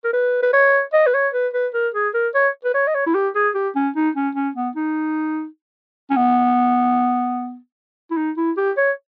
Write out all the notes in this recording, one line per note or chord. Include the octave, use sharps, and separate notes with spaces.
A#4
B4
B4
C#5
D#5
B4
C#5
B4
B4
A#4
G#4
A#4
C#5
B4
C#5
D#5
C#5
E4
G4
G#4
G4
C#4
D#4
C#4
C#4
B3
D#4
C#4
B3
E4
D#4
E4
G4
C#5